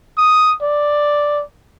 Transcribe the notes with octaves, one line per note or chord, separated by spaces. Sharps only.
D#6
D5